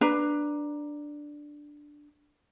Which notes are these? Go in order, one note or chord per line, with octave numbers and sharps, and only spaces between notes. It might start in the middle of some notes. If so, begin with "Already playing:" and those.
D4 B4 A#5